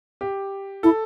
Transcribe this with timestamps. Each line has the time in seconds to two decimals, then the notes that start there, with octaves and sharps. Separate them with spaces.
0.21 G4
0.83 E4 A4